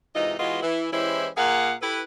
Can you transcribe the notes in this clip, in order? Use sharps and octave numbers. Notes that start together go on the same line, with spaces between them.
G#2 C3 E3 D#4 F4 D#5
E3 G#3 B3 F4 F#4 D#5
E3 E4
E3 G#3 C#4 E4 G4 C5
A#2 G#4 A#4 F5 F#5
E4 G4 A4 B4